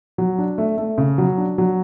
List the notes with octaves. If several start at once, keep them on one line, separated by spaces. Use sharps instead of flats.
F#3
D4
A3
A3
C#3
F#3
D4
F#3